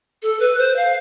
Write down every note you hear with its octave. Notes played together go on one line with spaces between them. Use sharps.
A4
B4
C5
F5